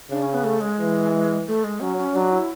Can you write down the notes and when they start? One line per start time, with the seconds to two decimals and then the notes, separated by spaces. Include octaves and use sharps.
0.11 C#3 D4
0.22 C#4
0.34 B3
0.44 A3
0.61 G#3
0.79 E3
1.47 A3
1.64 G#3
1.80 F#3 C#4
1.97 C#4
2.14 F#3 D4
2.32 E4